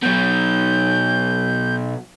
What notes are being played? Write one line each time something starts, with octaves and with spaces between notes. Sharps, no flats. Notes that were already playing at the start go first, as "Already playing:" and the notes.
B2 F#3 G6